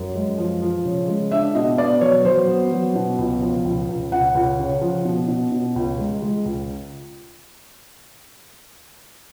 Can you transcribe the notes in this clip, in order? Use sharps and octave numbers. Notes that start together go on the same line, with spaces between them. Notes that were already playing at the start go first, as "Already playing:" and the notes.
Already playing: F#2
G#3
F3
F3
C#3
G#3
D4 E5
B2 D#5
B3 D5
F#3 C#5
F#3 C5
B3
F#3
B2
C#2
F3
C#2
C#2
C#2 F#5
C#2
C#3
F3
B2
B2
B2
C#2
G#3
G#3
C#2